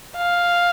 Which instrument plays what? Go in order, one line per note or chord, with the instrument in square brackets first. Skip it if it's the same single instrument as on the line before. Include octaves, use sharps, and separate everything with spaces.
[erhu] F5